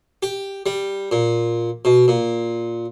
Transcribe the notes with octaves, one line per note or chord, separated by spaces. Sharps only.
G4
G3
A#2
B2
A#2